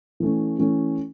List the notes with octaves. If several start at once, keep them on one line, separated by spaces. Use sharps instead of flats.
E3 A3 C#4
E3 A3 C#4